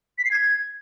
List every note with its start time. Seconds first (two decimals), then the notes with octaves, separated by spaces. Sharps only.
0.18 B6
0.25 C7
0.31 G#6